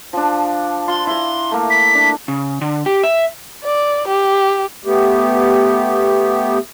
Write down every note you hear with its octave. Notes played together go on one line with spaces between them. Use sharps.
F3 D4
F4 C6
E4 A#5 C6
A3 A#3
B6
D4
C#3
D3
G4
E5
D5
G4
A3 B3 G4